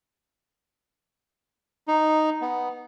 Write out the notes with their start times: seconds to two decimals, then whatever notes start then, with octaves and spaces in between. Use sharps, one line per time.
1.88 D#4
2.42 B3